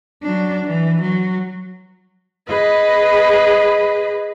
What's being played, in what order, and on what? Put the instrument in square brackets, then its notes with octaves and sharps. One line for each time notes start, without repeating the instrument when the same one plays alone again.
[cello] F#3 D4
E3
F#3
[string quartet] G#4 B4 D#5 B5